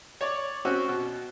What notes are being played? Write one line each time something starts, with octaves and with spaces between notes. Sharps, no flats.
C#5 D5
C4 C#4 F#4
B2